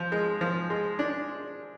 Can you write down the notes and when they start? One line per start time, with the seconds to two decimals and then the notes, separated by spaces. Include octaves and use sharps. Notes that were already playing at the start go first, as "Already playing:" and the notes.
Already playing: F3
0.12 G#3
0.41 F3
0.70 G#3
0.99 D4